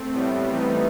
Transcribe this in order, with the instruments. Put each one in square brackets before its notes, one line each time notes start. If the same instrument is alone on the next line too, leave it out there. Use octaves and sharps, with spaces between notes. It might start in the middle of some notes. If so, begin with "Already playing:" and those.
Already playing: [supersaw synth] A3 C4
[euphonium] A2 [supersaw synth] G3 B3
[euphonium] E3 [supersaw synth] B3 D#4